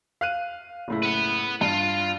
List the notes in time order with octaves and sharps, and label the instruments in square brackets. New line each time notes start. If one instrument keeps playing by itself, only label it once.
[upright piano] F5 F#6 D#7
F#1 A2 E4
[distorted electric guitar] B4 F#5
[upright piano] G2 [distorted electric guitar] F4